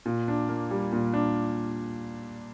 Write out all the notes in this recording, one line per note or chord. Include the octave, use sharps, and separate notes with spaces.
A#2
D4
A#3
G3
A#2
D4